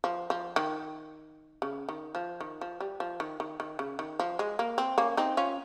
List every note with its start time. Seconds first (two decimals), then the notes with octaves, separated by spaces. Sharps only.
0.04 F3
0.30 F3
0.56 D#3
1.62 C#3
1.89 D#3
2.15 F3
2.40 D#3
2.61 F3
2.80 G3
3.00 F3
3.20 D#3
3.40 D#3
3.60 D#3
3.79 C#3
3.99 D#3
4.19 F3
4.39 G#3
4.59 A#3
4.78 C4
4.98 A#3 C#4
5.17 C4 D#4
5.37 C#4 F4